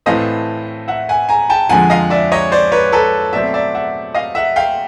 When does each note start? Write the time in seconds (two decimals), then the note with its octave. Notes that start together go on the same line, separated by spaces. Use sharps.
0.06 A2 E3 A3 C4 D#5 F5
0.88 E5 F#5
1.09 F#5 G#5
1.29 G#5 A#5
1.50 G5 A5
1.69 F2 D3 F3 G#3 F#5 G#5
1.90 D#5 F5
2.10 D5 E5
2.32 C#5 D#5
2.52 C5 D5
2.72 B4 C#5
2.92 A4 B4
3.33 B2 F#3 A3 C4 D5 E5
3.54 D5 E5
3.75 E5 F#5
4.14 D#5 F5
4.35 E5 F#5
4.56 F5 G5